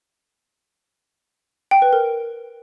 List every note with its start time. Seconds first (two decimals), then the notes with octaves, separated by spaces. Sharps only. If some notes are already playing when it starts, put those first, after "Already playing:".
1.71 G5
1.82 B4
1.93 A#4